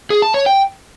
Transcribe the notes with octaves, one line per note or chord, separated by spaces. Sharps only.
G#4
A5
C#5
G5